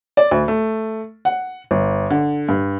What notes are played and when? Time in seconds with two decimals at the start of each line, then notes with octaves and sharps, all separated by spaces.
0.17 D5
0.31 D2
0.48 A3
1.25 F#5
1.71 G1
2.10 D3
2.48 G2